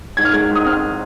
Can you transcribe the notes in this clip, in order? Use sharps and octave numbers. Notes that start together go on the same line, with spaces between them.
G#2 G#6
F6
G#3 G#6
G#2
D#6
C4 F6